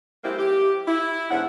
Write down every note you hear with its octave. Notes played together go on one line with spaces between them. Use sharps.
F#3 G#3 A#3 C4 E4 G4
G4
E4
G#2 D3 B3 C#4 F#5